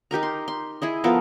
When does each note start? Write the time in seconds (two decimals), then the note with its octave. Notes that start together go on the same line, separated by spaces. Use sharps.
0.11 D#4 G4 A#4 A#5
0.23 C6
0.48 C6
0.82 E4 G#4 D#5
1.04 F3 B3 A4 A#4